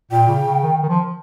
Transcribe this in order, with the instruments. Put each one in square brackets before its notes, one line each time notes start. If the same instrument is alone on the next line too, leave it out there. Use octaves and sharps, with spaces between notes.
[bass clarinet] A#2 [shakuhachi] G5
[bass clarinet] C#3
C#3
D#3
D#3
F3